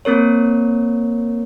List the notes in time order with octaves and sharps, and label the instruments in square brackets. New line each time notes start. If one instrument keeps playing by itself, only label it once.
[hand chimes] A#3 C4 A#4 C#5